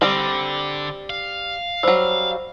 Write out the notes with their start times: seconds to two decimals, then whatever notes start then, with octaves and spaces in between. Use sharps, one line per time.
0.02 D3 G3 C4
1.10 F5
1.83 F#3 G3 C5 E6